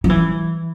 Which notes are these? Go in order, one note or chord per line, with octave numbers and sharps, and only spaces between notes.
F#3
E3